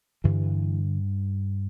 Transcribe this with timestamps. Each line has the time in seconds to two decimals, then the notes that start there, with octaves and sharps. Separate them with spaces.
0.24 G2 D3 E3